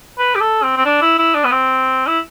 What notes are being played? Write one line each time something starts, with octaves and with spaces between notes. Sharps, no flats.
B4
G4
A4
C4
C4
D4
E4
E4
D4
B3
C4
E4